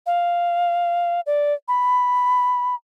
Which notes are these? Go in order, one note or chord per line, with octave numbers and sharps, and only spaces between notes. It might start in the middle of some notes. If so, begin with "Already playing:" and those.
F5
D5
B5